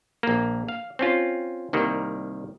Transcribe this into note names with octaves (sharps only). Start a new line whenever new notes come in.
A#1 A#3
F5
C4 C#4 F4
C2 D#3 G3 A#3